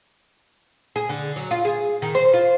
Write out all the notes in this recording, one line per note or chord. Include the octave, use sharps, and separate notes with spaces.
G#4
D3
F#3
F4
G#4
D#3
C5
F4